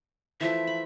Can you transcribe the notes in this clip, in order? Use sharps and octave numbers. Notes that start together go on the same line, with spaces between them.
E3 F3 A3 E5
B5